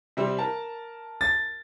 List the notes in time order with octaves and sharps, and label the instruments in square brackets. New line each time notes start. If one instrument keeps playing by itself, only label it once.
[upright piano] C3 G3 C4
A#4 A5
[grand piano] A6